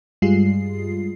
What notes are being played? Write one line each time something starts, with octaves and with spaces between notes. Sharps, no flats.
G2 G3 G#3 F4 G#4 C7